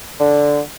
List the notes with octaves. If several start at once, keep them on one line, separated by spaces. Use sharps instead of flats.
D3